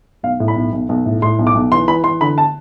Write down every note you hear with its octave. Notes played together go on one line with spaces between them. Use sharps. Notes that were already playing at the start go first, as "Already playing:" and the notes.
B1 F5
A2
B5
B1
B1
B1
A2
A2 C6
B1
D6
B1
E3 C6
E3 B5
E3 C6
D3 B5
A5